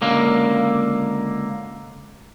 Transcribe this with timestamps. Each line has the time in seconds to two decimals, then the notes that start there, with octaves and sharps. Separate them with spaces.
0.02 C#2 D3 A#3